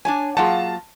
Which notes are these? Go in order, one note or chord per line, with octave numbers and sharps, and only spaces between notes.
D4 C#5 G#5 A5
F#3 A#3 F4 G#4 F5 F#5 A5